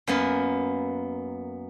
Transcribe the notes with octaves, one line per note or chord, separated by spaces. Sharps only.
F#2 A#3 B3